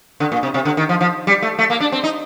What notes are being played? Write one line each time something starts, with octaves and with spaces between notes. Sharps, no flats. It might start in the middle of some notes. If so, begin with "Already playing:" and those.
D3
A#2
C3
C3
D3
D#3
F3
F3
G3
A3
A3
A#3
D4
C4
D#4